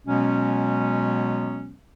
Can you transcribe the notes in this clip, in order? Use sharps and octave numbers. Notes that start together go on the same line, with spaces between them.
B2 F#3 G#3 B3 C#4